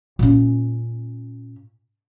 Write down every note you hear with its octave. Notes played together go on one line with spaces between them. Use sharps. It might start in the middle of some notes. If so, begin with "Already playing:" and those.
A#2 C#4